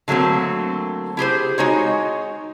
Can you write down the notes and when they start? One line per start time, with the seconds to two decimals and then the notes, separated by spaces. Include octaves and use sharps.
0.08 D3 F#3 A3 A#3 C4
1.17 E4 G4 G#4 C5
1.58 G#3 D#4 F#4 C#5